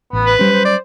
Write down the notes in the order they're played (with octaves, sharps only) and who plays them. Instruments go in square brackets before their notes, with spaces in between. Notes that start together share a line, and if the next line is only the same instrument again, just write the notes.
[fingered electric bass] A1 [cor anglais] B3
[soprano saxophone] B4
[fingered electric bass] F#3 G3 C#4 [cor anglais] C5
[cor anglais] C5
[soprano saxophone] D5